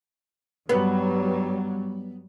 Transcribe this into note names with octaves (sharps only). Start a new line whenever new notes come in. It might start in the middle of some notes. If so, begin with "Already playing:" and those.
G2 F#3 G3 B3